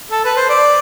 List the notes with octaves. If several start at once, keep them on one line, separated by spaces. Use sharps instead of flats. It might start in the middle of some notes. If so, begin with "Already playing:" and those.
A4
B4
C5
D5